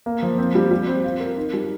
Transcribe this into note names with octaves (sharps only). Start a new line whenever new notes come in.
A#3
F3
C4
G3
G3
C4
F4
A#4
D#4
G3